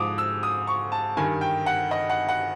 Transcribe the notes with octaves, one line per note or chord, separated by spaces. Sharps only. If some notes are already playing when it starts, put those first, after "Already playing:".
Already playing: G#2 F3 D6 D#6
E6
D#6
C#6
A5
G2 D#3 G#5
G5
F#5
D#5
F#5
F#5